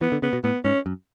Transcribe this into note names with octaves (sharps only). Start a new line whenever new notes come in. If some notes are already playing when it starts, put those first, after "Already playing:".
E3 B3
D3
C#3 B3
B2
A2 B3
G#2 C#4
F#2